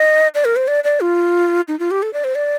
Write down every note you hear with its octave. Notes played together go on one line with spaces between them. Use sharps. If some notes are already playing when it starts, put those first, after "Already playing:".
Already playing: D#5
D5
A#4
C5
D5
D5
F4
D#4
F4
G4
A4
D5
C5
D5